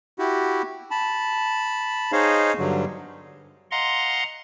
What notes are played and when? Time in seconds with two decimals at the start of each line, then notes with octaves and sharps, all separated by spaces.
0.19 E4 F#4 G4
0.91 A5 B5
2.12 D#4 G#4 C5 C#5 D#5 F5
2.59 G2 D3 F#3
3.71 D#5 F5 F#5 A#5 C6